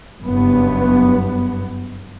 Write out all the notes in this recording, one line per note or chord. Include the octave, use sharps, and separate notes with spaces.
F#1 G2 B3